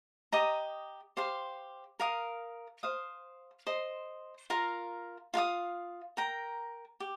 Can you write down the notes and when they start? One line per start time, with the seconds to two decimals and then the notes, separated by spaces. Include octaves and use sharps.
0.32 G4 D#5 A#5 D#6
1.17 G4 C5 F5 C6
2.00 A#4 F5 D#6
2.83 C5 F5 D#6
3.67 C5 D#5 C6
4.50 F4 A#4 F5 A#5
5.34 F4 A#4 F5 D#6
6.17 A#4 G5 A#5
7.00 G4